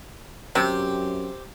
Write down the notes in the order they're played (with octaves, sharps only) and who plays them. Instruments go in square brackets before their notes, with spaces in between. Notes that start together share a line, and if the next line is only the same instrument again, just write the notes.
[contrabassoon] F#2 [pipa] C3 [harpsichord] C4 G4